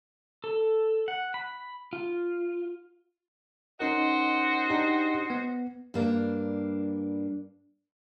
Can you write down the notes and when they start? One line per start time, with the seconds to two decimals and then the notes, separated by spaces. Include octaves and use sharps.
0.44 A4
1.08 F#5
1.34 B5
1.93 F4
3.80 C#4 D#4 F#4 A#4 C5 D#5
4.70 D4 D#4 G4
5.30 B3
5.94 G2 A#3 D4